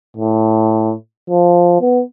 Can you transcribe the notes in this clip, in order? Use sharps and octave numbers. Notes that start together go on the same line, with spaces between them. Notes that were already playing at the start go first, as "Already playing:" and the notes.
A2
F3
B3